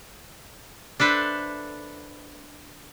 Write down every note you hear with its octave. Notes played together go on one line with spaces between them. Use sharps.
D4 A4 B4 C5 E5